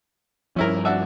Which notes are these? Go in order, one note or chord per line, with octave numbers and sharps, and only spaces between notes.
G2 F3 C#4 E4 A#4
D4 F#4 E5